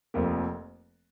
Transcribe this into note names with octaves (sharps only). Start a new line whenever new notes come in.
F1 F2 F3 A#3